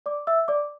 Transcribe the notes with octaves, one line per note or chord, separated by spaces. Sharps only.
D5 D6
E5 E6
D5 D6